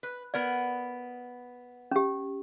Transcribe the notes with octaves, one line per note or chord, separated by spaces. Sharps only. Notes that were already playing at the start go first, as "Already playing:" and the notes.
B4
B3 A#4 D5 F#5
C#4 G4